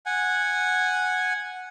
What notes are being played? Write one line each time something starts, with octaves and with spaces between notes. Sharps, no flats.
F#5 G#5